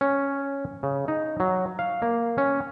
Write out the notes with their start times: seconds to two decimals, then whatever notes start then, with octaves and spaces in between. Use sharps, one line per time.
0.01 C#4
0.83 C#3
1.08 D#4
1.40 F#3
1.79 F5
2.02 A#3
2.38 C#4